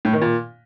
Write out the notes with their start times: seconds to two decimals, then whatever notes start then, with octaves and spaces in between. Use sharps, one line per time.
0.05 A2
0.13 D#3
0.22 A#2